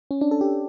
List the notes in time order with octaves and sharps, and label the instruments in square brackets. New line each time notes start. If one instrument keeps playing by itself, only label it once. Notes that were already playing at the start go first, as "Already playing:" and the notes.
[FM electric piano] C#4
D4
A4
G4